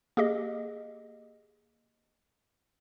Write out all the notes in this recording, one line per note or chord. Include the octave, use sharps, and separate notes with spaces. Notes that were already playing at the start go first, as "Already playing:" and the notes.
A#3 G4 G#4 D#5